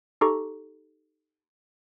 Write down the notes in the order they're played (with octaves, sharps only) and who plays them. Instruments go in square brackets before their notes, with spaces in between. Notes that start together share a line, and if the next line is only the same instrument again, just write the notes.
[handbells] D#4 G4 A4 A#5 C#6